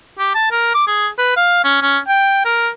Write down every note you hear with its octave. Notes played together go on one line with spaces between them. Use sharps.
G4
A5
A#4
D6
G#4
B4
F5
C#4
C#4
G5
A#4